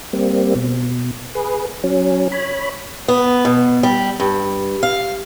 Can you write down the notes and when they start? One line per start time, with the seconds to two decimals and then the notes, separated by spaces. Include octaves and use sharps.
0.13 G3 A#3 C4
0.55 B2
1.35 G#4 B4
1.84 F#3 C#4
2.32 C#5 B5
3.08 B3
3.45 B2
3.83 G3
4.20 G2
4.83 F5